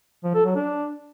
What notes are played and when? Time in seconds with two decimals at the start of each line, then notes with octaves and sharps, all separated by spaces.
0.24 F3
0.34 A4
0.45 F#3
0.55 D4